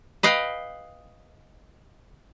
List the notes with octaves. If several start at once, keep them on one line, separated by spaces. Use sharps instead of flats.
B4 D#5 F5 G5